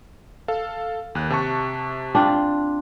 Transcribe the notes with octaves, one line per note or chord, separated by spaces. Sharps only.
A4 F5
D#2 F#6
C3 A5 C#6
C4 D4 F4